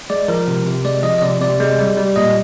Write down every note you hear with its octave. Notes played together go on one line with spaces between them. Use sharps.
G#3 D5
F3 A#4
C3
C3
G#3 D5
F3 D#5
D#5
C3 D5
C3 D5
G#3
G3
G3
A#2 D#5